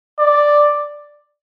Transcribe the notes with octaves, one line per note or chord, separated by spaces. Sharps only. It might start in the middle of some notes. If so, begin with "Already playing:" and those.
D5